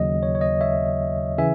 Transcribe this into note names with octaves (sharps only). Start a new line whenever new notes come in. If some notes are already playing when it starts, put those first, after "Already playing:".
Already playing: D#2 C#3 F#3 D#5
C#5
C#5
D#5
C#5 E5
C#3 E3 E5 G#5